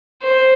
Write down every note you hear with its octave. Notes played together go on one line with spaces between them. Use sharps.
C5